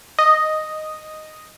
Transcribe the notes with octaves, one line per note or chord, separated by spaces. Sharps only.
D#5